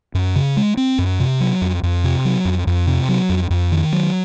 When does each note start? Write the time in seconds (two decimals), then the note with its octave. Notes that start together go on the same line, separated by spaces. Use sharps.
0.14 F#2
0.36 C#3
0.57 G#3
0.77 C4
0.99 F#2
1.20 C3
1.40 F#3
1.62 F2
1.83 F2
2.04 C3
2.25 F#3
2.45 F2
2.67 F2
2.87 C3
3.09 F#3
3.29 F2
3.50 F2
3.71 D#3
3.92 F#3